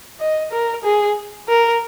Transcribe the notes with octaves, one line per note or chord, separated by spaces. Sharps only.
D#5
A#4
G#4
A#4